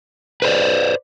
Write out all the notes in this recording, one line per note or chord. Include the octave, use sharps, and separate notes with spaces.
B4 C5 D5